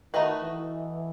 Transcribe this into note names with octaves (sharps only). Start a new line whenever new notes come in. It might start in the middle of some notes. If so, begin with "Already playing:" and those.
D#3 A3 D#4 F#4 B4 D#5
E3